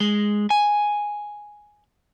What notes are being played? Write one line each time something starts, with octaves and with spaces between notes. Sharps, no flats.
G#3
G#5